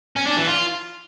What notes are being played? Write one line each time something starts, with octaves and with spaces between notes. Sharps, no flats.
C#4
D4
E3
F4